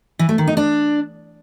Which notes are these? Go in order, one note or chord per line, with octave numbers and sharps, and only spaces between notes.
E3
A3
D#3
D#4
D4